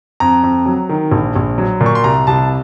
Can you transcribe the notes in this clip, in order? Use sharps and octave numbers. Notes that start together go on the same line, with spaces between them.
F2 A#5
F2
F#3
D#3
A#1
A#1
F#3
A#2
C#6
C6
C2 A#5
C2 A5